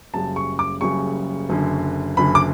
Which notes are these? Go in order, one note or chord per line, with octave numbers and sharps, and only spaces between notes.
F#1 F#2 C#3 G3 A5
C#6
D6
F#1 F#2 C#3 G3 C#6
F#1 F#2 D3
F#1 F#2 D3 B5
D6